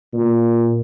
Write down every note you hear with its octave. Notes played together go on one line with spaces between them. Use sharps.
A#2